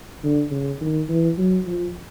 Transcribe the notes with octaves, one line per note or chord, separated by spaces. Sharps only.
D3
C#3
D#3
E3
F#3
F3